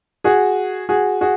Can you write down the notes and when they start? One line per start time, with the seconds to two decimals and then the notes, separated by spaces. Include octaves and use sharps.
0.24 F#4 G#4
0.89 F#4 G#4
1.21 F#4 G#4